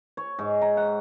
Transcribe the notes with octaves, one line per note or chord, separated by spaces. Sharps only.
C#5
G#2
A#5
F#5